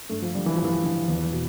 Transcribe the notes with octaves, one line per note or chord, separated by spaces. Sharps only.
G2 A3
F3
D3 G3
E3
F3
G2
E3
D3
E2
B2